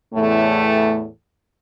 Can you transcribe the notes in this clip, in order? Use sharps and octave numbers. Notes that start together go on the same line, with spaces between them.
E2 A2 A3